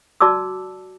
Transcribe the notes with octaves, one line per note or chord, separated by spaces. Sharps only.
F#4 D5 A5 D6 E6